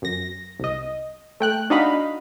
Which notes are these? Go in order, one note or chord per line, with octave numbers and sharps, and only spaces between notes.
F#2 A#6
C2 D#5
A3 G5 F#6
D4 D#4 F#4 D#5 F5 B5